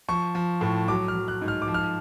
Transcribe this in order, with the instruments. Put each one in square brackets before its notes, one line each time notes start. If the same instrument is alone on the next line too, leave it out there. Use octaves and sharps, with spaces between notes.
[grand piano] F3 C#6
F3
A2
F#3 D6
F6
F#3
F#6
G#2
F6
D6
F3
F6